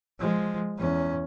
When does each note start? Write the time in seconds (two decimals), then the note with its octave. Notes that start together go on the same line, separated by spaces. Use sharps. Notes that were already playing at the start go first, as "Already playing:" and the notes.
0.20 F3 G#3
0.78 E2 C#4